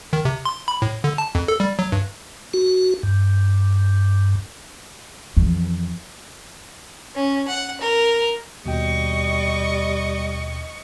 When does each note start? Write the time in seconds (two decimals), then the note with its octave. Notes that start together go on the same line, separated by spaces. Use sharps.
0.13 D#3
0.25 C3
0.45 C6
0.68 B5
0.82 A2
1.04 D3
1.18 A5
1.35 F2
1.48 A4
1.60 G3
1.79 F#3
1.92 G2
2.54 F#4
3.03 G2
5.37 F2 E3
7.15 C#4
7.48 F#5
7.81 A#4
8.65 D#2 B2 G3 D#5 G5 C#6